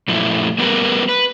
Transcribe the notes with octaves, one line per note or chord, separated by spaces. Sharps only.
F#2 A#2 F3 A3 E4
G3 A#3 B3 G4 A#4 B4
B4